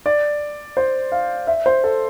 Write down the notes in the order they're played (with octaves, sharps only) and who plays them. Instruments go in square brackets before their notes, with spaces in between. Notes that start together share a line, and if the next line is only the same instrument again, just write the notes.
[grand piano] D5
C5
F5
E5
C5
A4